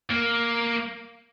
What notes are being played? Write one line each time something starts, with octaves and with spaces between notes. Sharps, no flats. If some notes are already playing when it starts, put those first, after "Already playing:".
A#3